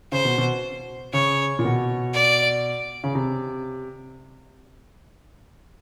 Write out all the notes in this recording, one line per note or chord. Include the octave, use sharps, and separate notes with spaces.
C#3 C5
B2
B2
C#3 C#5
A#2
B2
D5
C#3
C3